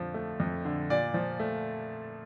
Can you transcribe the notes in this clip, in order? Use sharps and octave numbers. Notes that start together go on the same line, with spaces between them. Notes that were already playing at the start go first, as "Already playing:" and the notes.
Already playing: F2 D3 F3
A3
F2
D3
A#2 D5
F3
A3